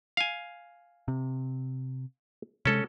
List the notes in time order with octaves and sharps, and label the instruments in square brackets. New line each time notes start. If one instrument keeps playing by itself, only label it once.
[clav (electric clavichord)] F5 G#5
[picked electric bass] C3
[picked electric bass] C3 G#3 [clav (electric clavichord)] C#4 A4